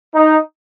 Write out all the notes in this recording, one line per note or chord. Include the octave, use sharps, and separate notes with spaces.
D#4